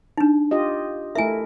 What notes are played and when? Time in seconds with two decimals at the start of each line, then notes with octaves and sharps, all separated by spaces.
0.18 D4 D#4
0.51 F4 G4 D#5
1.15 A3 E4 A#4 E5 G#5